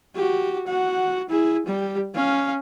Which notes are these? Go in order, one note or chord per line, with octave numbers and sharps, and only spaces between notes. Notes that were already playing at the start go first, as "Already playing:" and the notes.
F#4 G4
F#4 F#5
E4 G#4
G3 G4
C#4 F5